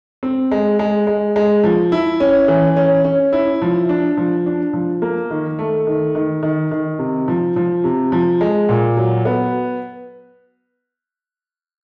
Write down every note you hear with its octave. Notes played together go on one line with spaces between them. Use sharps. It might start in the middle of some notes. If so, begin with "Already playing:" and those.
C4
G#3
G#3
G#3
G#3
F3
E4
C#4
E3
C#4
C#4
E4
F3
D4
F3
D4
F3
A#3
D#3
A3
D#3
D#3
D#3
D#3
C3
F3
F3
C3
F3
G#3
A#2
F#3
B3